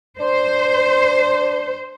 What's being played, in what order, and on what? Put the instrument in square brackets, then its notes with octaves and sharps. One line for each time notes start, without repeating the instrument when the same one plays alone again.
[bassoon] D4 [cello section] C5